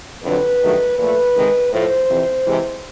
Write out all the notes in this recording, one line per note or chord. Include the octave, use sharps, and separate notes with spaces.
F2 D3 F#3 B4
G2 D#3 F#3 A3
A#2 F3 A3 B4
C3 D#3 G#3
A2 F3 A3 C5
F2 C3 E3
C3 E3 G#3